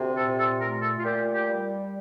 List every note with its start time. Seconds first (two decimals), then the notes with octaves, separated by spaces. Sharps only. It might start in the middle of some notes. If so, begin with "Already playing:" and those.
Already playing: D2 C3
0.16 A#2 A4
0.38 A4
0.60 A3 A#4
0.82 A4
0.98 F4
1.04 A#2 G4
1.33 G4
1.48 G3